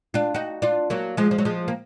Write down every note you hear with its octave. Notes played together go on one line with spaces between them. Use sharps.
D4 F4
D#4 F#4
D4 F4
F#3 A#3
F3 G#3
F3
F#3
F3 G#3
A#3